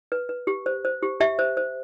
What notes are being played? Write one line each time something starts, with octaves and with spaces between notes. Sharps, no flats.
B4
B4
G4
C5
C5
G4
G4 E5
C5
C5